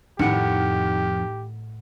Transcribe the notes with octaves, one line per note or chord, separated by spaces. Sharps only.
F2 A2 D#3 G4 F#5 C#7